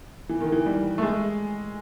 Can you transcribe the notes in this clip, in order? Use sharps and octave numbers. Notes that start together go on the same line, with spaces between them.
E3
D#3
E3
G3
A3
G#3